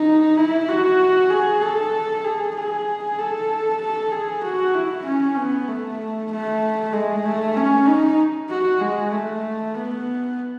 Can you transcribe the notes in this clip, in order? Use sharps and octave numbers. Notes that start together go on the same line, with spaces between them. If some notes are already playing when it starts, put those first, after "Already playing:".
Already playing: D#4
E4
F#4
G#4
A4
G#4
G#4
A4
A4
G#4
F#4
E4
C#4
B3
A3
A3
G#3
A3
C#4
D#4
F#4
G#3
A3
B3